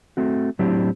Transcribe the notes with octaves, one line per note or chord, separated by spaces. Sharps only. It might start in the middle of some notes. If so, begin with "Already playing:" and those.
A3 C4 F#4
A2 F#3 C4 D4 E4 G4